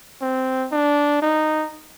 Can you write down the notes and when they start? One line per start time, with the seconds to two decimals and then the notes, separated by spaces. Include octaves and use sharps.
0.22 C4
0.72 D4
1.22 D#4